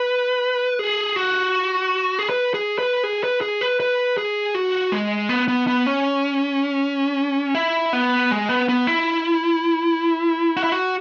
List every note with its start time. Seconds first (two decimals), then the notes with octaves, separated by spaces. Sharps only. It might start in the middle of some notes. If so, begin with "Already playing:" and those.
Already playing: B4
0.79 G#4
1.16 F#4
2.19 G#4
2.29 B4
2.54 G#4
2.79 B4
3.04 G#4
3.24 B4
3.41 G#4
3.61 B4
3.80 B4
4.18 G#4
4.55 F#4
4.92 G#3
5.29 B3
5.48 B3
5.67 B3
5.87 C#4
7.55 E4
7.93 B3
8.31 G#3
8.49 B3
8.69 B3
8.87 E4
10.57 F#4
10.64 E4
10.72 F#4